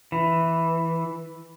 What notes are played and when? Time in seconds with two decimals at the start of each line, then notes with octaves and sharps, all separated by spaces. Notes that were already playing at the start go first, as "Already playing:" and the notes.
0.12 E3